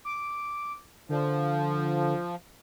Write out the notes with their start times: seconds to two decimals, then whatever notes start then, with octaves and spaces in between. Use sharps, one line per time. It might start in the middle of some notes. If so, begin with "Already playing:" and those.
0.05 D6
1.09 D3 F3